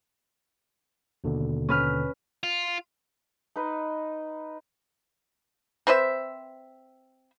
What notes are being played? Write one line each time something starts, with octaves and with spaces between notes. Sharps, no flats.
D#2 B2 D3
C#4 B4 F6
F4
D#4 B4 D#5
C4 B4 C5 E5